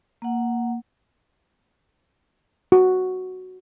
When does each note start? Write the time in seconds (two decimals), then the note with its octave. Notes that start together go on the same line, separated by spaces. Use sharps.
0.22 A#3 F#5
2.72 F#4